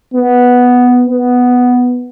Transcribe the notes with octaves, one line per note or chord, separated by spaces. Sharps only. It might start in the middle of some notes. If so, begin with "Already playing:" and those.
B3
B3